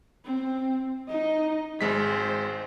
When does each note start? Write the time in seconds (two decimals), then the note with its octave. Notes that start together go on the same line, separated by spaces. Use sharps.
0.24 C4
1.08 D#4 D#5
1.81 G#1 G#3 C5 B6